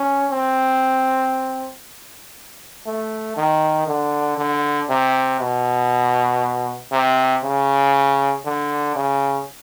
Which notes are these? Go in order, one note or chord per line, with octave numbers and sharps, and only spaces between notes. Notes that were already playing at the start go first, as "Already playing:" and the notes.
Already playing: C#4
C4
A3
D#3
D3
D3
C3
B2
C3
C#3
D3
C#3